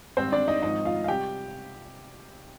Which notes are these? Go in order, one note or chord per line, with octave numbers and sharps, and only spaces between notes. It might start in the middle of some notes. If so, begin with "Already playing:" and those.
G#1 G#2 G3 C4 C5
D4 D5
D#4 D#5
G#1 G#2 F3 D#4 D#5
F4 F5
F5
C3 G3 G4 G5